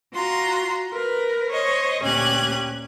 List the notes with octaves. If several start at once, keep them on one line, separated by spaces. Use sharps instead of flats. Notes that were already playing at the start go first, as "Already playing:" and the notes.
F4 F#4 A#5 C6
A#4 B4
C5 C#5 D#5
D2 A#2 C#4 G4 F#6 G#6